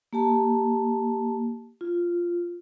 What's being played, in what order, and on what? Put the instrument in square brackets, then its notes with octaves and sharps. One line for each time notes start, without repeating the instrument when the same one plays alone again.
[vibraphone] A#3 G4 A5
F4